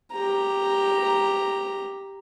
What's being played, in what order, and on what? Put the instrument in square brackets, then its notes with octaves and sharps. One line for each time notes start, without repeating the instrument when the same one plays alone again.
[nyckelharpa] G4 A#5